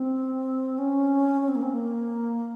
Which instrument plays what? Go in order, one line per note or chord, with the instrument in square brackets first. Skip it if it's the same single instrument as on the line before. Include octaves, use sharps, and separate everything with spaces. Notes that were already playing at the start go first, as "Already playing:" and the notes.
Already playing: [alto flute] C4
C#4
C#4
C4
A#3
C4
A#3